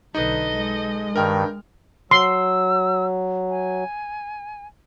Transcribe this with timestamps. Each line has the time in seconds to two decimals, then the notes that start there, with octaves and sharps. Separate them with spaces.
0.15 B1 D3 D#4 A4 B4 D#5
0.56 G#3
1.16 G2 D#3 A#4 G5 F6
2.11 F#3 C6 E6
3.49 G#5